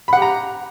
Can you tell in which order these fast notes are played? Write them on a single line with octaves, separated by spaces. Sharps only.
B5 F#5 G4 A#5